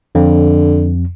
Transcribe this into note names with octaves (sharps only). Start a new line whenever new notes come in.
F2 D3